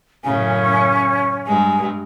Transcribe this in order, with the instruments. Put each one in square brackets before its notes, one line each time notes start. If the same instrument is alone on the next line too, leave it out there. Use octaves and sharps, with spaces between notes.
[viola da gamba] F#2 A2 C#3 [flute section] C#4 [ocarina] G#5
[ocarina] C#6
[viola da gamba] G2 G#3 [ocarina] G#5